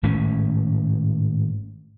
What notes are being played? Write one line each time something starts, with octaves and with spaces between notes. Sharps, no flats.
G#1 A2 A3 C#4